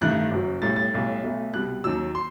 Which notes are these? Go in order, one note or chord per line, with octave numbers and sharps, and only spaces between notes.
A1 G2 D#3 A3 F#6
F#1 F#2 F#3
B1 A2 G3 A6
A6
B1 A2 G3
B1 B2 A3
C2 B2 G3 F#6
D#2 D#3 F#3 E6
C6